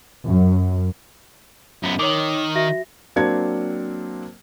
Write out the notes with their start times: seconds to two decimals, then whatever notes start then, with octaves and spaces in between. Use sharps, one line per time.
0.25 F#2
1.83 F#2 B3
1.99 D#3 C#5 D6
2.55 F#4 E5 A#6
3.16 F#3 A#3 C4 D4 G#6 C#7